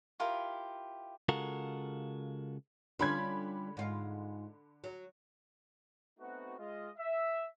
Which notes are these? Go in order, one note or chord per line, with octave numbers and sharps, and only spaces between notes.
E4 F4 G4 A#4
C#3 G#3 F4 F#4 A4 A#4
D3 G3 C#4 F4 B5 G#6
G#2 F4
F#3
A3 B3 C4 D#4 F#4
G#3 F4 D#5
E5